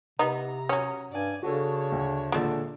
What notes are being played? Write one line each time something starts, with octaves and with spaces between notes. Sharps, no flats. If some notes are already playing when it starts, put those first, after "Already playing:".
C3 B3 D#4 A#5
F#3 C#4 D#6
G2 D5 G#5
C#3 D4 F#4 A4 C#5
D2
A#2 D3 G#3 A3